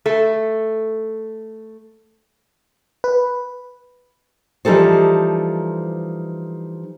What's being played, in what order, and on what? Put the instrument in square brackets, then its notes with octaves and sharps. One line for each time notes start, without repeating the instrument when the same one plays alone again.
[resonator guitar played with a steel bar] A3 A4
[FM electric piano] B4
[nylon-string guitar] E3 F3 G3 D#4 A4 C5